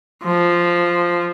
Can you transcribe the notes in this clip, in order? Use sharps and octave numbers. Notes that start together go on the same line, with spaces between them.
F3